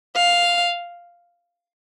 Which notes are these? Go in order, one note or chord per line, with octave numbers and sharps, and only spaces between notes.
F5